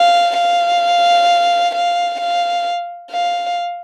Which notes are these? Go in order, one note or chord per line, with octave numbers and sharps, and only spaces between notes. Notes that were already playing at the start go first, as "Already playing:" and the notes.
Already playing: F5
F5
F5
F5
F5